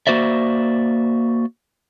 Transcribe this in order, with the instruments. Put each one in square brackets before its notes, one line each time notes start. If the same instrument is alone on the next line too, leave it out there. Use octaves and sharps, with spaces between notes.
[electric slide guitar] A#3 F#4 C5 D5 E5